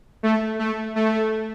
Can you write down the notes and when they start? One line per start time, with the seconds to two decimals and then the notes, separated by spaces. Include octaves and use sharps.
0.23 A3
0.59 A3
0.96 A3